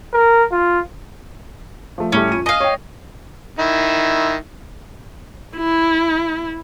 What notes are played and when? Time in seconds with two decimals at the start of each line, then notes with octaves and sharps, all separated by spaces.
0.14 A#4
0.52 F4
1.98 F3 A3
2.12 A2 G3 A3 C#4
2.30 F2 D#7
2.46 D#5 F5 G#5 A#6
2.60 C#5 G5
3.59 D#3 E4
5.57 E4